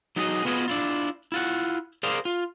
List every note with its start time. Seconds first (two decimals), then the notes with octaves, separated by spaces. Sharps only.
0.16 F#3 D#4 E4 F#4 G#4 D#5
0.45 B3 F4 F#4 G#4 B4 D#5
0.68 D4 E4 F4
1.32 E4 F4 F#5
2.03 G#4 A#4 C5 D5 F5
2.25 F4